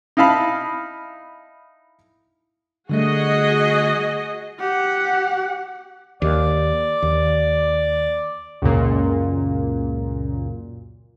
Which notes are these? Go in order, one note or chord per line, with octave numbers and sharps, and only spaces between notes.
D#4 E4 F5 A5 B5
D3 G3 A3 F#4 G#4 D#5
G4 F#5
D#2 D5
D#2
C#2 F#2 A#2